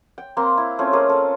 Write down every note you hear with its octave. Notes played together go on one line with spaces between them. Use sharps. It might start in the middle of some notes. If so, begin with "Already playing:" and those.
G5
A#3 C4 A#5 C6
E4
A3 C4 C#4 F4
A#3 F4 G#4 D#5
A4